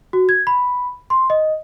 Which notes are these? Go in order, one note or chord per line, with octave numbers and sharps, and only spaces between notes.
F#4
G#6
B5
C6
D#5